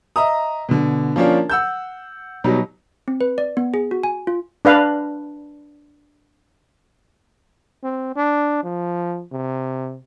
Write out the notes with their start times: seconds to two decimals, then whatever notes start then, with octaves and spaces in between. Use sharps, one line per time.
0.16 D#5 E5 A#5 D#6
0.69 B2 D3
1.16 F3 A#3 C#4 D4 F4
1.50 F#5 E6 G6
2.44 B2 F#3 G3 D#4
3.08 C4
3.21 B4
3.38 D5
3.57 B3
3.74 G#4
3.91 F#4
4.03 G#5
4.27 F4
4.65 D4 B4 F5
7.84 C4
8.16 D4
8.64 F3
9.32 C3